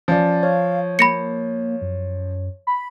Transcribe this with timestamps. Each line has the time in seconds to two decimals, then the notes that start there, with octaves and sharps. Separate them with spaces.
0.08 F3 C#4 D5
0.43 C#5 F5
0.99 A#3 B5 A#6 C#7
1.82 F#2
2.67 B5